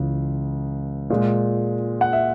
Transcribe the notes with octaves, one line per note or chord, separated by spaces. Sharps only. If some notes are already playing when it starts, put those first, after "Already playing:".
Already playing: C#2 C#3 E3
A#2 G#3
F#5
E5